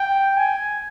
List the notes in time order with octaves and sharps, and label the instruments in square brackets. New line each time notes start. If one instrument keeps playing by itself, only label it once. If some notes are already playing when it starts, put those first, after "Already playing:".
Already playing: [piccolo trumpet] G5
G#5